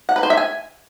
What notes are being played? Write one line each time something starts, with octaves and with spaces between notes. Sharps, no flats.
F#5
B4
C5
E5
G#5